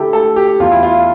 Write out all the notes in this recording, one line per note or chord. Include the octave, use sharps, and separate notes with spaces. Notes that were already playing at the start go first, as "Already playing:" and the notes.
Already playing: D3 A3 E4 G4 A4
A3 A4
G4
E2 F4
E4
F4